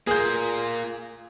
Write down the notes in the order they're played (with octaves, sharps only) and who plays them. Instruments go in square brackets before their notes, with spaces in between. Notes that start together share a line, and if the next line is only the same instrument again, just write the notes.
[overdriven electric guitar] A#3 F4 [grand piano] G#4 G6